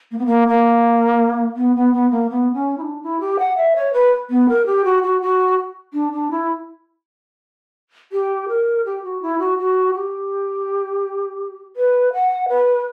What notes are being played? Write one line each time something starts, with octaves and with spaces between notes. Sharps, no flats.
A#3
B3
A#3
A#3
B3
B3
B3
A#3
B3
C#4
E4
D4
E4
G4
F#5
E5
C#5
B4
B3
A#4
G4
F#4
F#4
F#4
D4
D4
E4
G4
A#4
G4
F#4
E4
F#4
F#4
G4
B4
F#5
B4